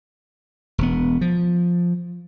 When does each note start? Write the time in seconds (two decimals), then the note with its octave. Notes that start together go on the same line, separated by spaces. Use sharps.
0.78 E1 B3
1.21 F3